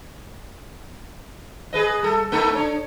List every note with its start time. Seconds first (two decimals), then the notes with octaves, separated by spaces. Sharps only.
1.73 G#4 B4 D#5
2.03 G3 A4
2.32 A3 D#4 A4
2.55 D4 C#5